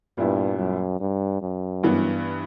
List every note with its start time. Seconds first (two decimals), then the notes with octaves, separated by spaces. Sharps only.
0.18 G2 A#2 G3 B3 E4
0.58 F#2
1.00 G2
1.42 F#2
1.83 G2 E3 B3